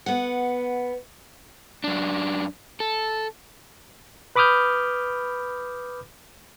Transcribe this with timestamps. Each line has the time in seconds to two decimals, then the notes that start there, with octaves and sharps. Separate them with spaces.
0.06 B3 F#5
1.84 F#2 D4
2.80 A4
4.36 B4 B5 D6 D#6 F6 G6